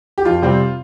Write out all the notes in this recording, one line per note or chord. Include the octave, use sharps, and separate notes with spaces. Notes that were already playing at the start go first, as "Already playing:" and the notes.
G4
F2 F4
C3 G3 C4